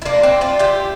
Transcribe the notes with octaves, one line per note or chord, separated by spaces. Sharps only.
E4
A#3 D4
C4 E4
D4 F4
E4 G4